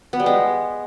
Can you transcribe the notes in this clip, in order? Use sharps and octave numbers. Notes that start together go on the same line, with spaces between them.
B3
G3
G#3